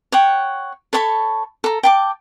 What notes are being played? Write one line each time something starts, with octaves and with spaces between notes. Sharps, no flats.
C#5 F#5 G5
A4 C#5 A5 B5
A4 A#5
G5 A5 D6